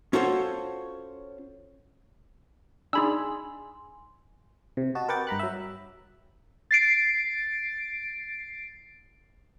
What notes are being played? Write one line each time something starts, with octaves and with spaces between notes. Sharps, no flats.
C#4 F4 F#4 A4 C5 C#5
D4 D#4 G#4 G#5 B5 C6 E6
C3
F#4 D#5 A5
A#4 B4 F#5 G5 D6 A6
G2 A#5 B5 F#6
F#3 E5
A6 C7 D7